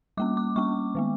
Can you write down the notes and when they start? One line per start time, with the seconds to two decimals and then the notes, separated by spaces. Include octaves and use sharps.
0.17 G3 A#3 C#4 D6
0.37 D6
0.56 G3 A#3 C#4 C#6
0.95 D#3 G#3 B3